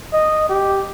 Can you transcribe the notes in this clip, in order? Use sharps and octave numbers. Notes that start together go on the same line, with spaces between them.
D#5
G4